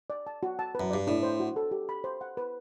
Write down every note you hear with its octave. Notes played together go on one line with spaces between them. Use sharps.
D5
A5
F#4
A5
F#2 B4
G2 D5
A2 D4
C5
F#4
A4
G4
B5
C5
F#5
B4